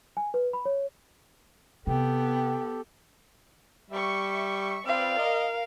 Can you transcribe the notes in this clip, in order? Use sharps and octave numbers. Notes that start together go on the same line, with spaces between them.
G#5
B4
B5
C#5
C3 B3 G4 A4 G5
G3 E5 C#6
C4 F4 B4 D5 F5
A#4 D#5